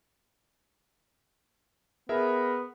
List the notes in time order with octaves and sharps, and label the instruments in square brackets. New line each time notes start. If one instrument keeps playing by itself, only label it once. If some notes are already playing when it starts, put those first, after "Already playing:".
[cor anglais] B3 [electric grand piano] G#4 A#4 E5